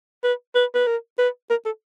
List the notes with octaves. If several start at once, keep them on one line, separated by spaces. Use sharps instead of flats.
B4
B4
B4
A#4
B4
A#4
A4